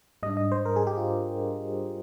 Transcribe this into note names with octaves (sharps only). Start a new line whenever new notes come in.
G#2 G3 D4 D#5
D#5
C5
A#4
G#4
G4
F4